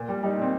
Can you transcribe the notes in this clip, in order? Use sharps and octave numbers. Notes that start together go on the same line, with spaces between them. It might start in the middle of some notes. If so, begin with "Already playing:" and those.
Already playing: A#2
G3
G3 D#4
A#2 C4